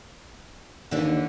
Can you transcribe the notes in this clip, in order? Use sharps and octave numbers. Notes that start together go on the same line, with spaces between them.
D#2 D3 E3 D4